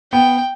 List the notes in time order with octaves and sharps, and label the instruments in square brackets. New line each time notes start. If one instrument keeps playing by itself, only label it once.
[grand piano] B3 [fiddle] G5